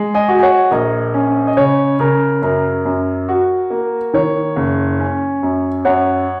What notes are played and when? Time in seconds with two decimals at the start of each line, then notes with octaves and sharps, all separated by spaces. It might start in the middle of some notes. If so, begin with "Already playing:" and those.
Already playing: G#3
0.14 D#5 G#5
0.28 F#4
0.39 G#5
0.43 C#5 F#5
0.71 A#1 A#4 D#5
1.14 C#4
1.47 D#5
1.57 C#3 C#5
1.99 C#3 A#4
2.42 F#2 A#4
2.85 F#2
3.29 F#4
3.70 A#3
4.13 D#3 C#5
4.56 F#1
5.00 C#4
5.43 F#2
5.85 F#2 C#5 F#5